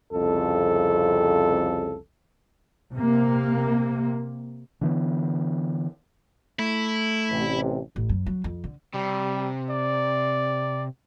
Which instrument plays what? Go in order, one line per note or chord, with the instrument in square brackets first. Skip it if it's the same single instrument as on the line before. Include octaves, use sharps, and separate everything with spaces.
[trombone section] C2 F2 C#3 A4
[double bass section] C3 A#3
[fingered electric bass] D3 E3 B3
[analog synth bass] A3 [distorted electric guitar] E4
[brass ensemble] A1 C3
[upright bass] A1
F#2
F#3
F2
D3
[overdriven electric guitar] C3 [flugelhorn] G3
[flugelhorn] D5